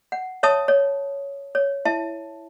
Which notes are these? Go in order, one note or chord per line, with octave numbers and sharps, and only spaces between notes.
F#5
C#5 E5 A5 D#6
C#5
C#5
E4 E5 A5